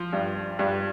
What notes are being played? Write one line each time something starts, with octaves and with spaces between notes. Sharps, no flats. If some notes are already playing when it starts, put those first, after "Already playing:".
Already playing: F3
G2
G2